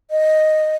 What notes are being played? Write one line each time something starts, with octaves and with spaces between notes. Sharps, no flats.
D#5